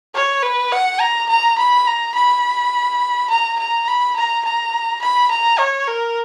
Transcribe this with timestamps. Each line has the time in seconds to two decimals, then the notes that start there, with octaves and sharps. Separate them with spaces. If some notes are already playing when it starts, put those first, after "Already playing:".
0.15 C#5
0.43 B4
0.72 F#5
1.00 A#5
1.29 A#5
1.58 B5
1.87 A#5
2.15 B5
3.30 A#5
3.59 A#5
3.87 B5
4.16 A#5
4.45 A#5
5.02 B5
5.31 A#5
5.59 C#5
5.88 A#4